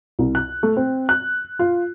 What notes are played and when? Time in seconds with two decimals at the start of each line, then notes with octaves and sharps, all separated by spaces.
0.19 C2
0.35 F#6
0.63 A3
0.77 C4
1.09 F#6
1.59 F4